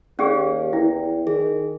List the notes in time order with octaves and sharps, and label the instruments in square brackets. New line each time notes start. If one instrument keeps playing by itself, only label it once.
[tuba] D#2 [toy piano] C#4 G4 G#4 [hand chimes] D5 F5
[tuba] E2 [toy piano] E4 [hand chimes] G5
[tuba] D#3 [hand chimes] G#4